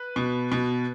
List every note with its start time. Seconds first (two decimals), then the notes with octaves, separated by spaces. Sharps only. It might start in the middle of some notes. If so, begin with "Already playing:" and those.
Already playing: B4
0.16 B2
0.52 B2